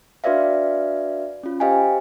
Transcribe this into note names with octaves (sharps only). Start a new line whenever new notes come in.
D4 F#4 B4 D5 E5 F5
C#4 F4
G4 C5 D#5 F5 G5 G#5